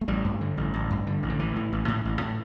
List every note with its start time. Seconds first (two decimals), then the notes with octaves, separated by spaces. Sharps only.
0.01 A3
0.08 A1 G3
0.24 G2
0.41 D3
0.57 A1
0.74 A1
0.90 G2
1.07 D3
1.23 A1
1.29 D3
1.39 A1 E3
1.56 A2
1.72 A1
1.88 A2
2.05 A1
2.21 A2